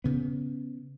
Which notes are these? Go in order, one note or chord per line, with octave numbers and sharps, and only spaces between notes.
C#3 B3